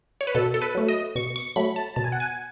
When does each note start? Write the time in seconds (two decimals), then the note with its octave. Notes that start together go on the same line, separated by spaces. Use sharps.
0.21 C#5
0.27 B4
0.35 B2 A4
0.54 A4
0.62 B4
0.75 F#3 A3
0.88 D#5
1.15 B2 C#6
1.36 C#6
1.56 F#3 A3 B5
1.76 A5
1.96 B2 A5
2.04 G#5
2.12 F#5
2.20 G#5